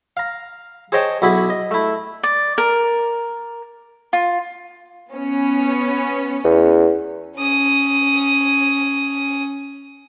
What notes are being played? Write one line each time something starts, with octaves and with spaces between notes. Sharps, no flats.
F5 A#5
G#4 C5 C#5 D#5 G5 A5
B1 E4 F#4 G#4 B5
D#5
A3 E4
D5
A#4
F4
B3 C#4
E2
C#4 D#6